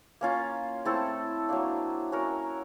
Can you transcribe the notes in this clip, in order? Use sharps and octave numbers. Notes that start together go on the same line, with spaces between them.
A#3 C#4 F4
A3 C4 E4 A4
F#3 A#3 D4
C#4 F#4 A#4